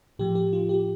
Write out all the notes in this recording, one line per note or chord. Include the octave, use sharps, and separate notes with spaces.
A2 F3 G4
G4
F4
G4